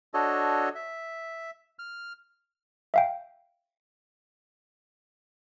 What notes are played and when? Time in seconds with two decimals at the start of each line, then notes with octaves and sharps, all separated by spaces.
0.14 D4 F#4 A4 C#5 D#5
0.75 E5
1.79 F6
2.94 E5 F5 G5